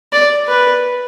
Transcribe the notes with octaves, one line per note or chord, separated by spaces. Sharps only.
D5
B4